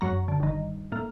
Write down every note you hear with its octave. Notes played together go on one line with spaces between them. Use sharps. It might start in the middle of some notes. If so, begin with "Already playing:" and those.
F#2 F#3 A#5
D3
G1 D#3
A2 A#3